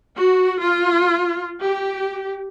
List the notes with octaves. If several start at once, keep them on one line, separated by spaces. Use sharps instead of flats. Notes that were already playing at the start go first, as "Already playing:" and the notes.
F#4
F4
G4